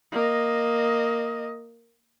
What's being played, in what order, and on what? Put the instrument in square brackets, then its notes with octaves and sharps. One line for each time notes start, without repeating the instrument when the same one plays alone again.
[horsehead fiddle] A#3 D#5